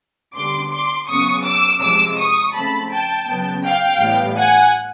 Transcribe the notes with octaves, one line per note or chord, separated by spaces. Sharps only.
D3 G3 B3 C6 D6
C6 D6
C#3 F#3 B3 C#6 D#6
D6 E6
C3 F3 G#3 D6 E6
C#6 D#6
C#3 F3 A3 C4 A5 B5
G5 A5
C#3 F#3 B3
F5 G5
A2 E3 G3 B3
F#5 G#5